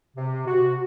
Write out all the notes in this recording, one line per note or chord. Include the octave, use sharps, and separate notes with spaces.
C3
F#4